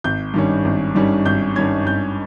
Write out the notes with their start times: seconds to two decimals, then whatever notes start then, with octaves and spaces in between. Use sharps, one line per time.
0.04 G#1 G6
0.34 G2 D#3 G3 C#4
0.65 G#1
0.95 G2 D#3 G3 C#4
1.25 G#1 G6
1.56 G2 D#3 G3 C#4 G#6
1.86 G#1 G6